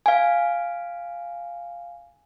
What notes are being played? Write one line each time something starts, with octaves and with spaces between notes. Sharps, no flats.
F5 G#5